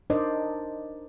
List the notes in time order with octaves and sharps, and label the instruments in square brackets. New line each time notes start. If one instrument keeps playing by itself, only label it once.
[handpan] D4 D#4 A#4 C5 D5 D#5